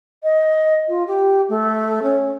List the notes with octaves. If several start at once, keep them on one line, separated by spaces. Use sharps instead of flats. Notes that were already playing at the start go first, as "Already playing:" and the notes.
D#5
F4
G4
A3
C#4